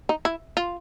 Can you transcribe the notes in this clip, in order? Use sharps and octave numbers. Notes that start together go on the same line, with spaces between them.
D#4
E4
F4